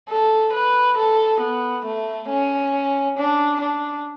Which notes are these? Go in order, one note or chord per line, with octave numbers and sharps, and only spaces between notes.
A4
B4
A4
B3
A3
C#4
D4
D4